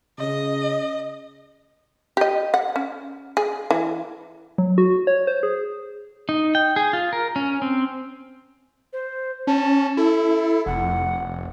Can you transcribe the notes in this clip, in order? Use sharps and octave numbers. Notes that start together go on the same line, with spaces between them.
C#3 D#5
G4 D#5
F#5
C#4
G#4
E3
F#3
F#4
C#5
C5
G#4
D#4
G5
G#4
F4
A#4
C#4
C4
C5
C#4 A5
E4 A4
F1 F#5